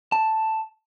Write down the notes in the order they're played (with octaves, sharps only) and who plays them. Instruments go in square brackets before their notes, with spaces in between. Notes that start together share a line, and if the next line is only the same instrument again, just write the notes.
[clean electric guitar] A5